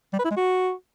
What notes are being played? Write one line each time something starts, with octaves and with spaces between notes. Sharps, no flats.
G3
B4
E4
G#3
F#4